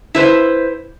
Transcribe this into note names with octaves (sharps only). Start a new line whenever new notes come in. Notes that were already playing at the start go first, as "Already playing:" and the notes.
E4 B4 C5